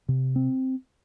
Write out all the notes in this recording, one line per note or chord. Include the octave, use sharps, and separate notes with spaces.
C3
C4